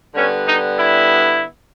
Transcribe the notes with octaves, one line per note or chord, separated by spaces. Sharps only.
D3 G3 B3 C#4
D#4
E4